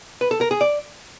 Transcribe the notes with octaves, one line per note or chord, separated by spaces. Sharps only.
B4
A4
A#4
G#4
D5